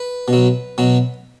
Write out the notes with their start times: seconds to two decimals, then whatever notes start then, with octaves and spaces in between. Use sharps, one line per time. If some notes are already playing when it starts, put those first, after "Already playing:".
Already playing: B4
0.28 B2
0.33 F#3
0.78 B2 F#3